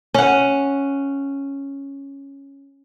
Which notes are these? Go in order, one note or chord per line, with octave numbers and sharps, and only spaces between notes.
C#4 F#5